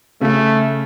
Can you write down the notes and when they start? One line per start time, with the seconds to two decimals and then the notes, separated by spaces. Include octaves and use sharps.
0.21 C#3 A3